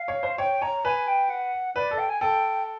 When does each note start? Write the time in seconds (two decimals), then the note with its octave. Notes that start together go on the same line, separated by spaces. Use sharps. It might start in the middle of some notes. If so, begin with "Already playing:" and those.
Already playing: F5
0.08 C#5
0.23 C5
0.38 C#5 G5
0.62 C#5 A#5
0.85 B4 G#5
1.07 G5
1.29 F#5
1.76 B4 D5
1.91 A4
1.98 G5
2.09 G#5
2.21 A4 G5